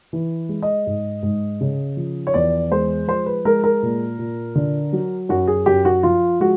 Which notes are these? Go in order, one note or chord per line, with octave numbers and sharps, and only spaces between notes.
E3
G#3
D#5
G#2
G#2
C#3
F3
C#5
E2 D5
G#3 C5
F3 C5
B4
G#3 A#4
A#4
A#2
A#2
D3
F#3
F#2 F#4
G#4
F#2 G4
F#4
F3 F4
G#3 F#4